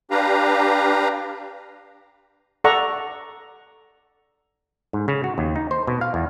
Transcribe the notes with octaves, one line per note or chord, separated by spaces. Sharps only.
D4 G4 B4 F5 A#5
A4 D5 F#5 A#5 C#6 E6
G#2
C#3
F#4
D#2
D#4
C5
B2
F5
E2